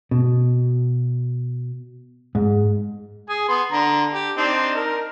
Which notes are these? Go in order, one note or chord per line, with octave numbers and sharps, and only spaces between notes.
B2
G#2
G#4 G#5
B3 C6
D3 A#5
G4
C4 D4 D#4
A#4